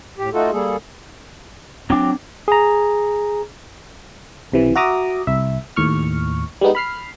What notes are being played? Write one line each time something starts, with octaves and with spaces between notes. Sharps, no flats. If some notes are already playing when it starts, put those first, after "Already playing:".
A2 G4
A3 D#4 F4 F#4 A4
G3 A#3 G#4 A4
F#3 C4 D4 G5 D6
G#4 A#5
B1 C3 E3
F#4 E5 A#5 D6 D#6
C2 E5
D#2 A2 C#6 F6
G3 G#3 B3 D#4
B5 F6 C7